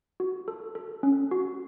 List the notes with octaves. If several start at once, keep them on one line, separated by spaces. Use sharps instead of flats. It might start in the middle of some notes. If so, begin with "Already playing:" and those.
F#4
A4
A4
C#4
F#4